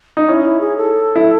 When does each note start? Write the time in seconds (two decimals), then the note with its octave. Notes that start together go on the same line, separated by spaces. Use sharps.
0.17 D#4
0.28 C#4 E4
0.44 E4
0.60 G#4
0.77 A4
1.16 E4